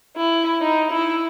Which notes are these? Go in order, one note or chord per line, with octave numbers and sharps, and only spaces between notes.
E4
D#4
E4